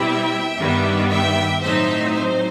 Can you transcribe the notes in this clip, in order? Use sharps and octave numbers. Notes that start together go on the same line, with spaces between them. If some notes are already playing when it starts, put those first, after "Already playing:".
Already playing: B2 G3 C4 E4 E5 G5
G2 D#3 G3 B3
E5 G5
A2 F#3 C4 D#4 C5 E5
C5